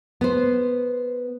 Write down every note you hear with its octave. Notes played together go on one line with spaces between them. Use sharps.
B3 C5